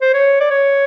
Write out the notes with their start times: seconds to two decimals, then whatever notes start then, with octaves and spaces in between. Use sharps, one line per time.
0.02 C5
0.14 C#5
0.41 D5
0.51 C#5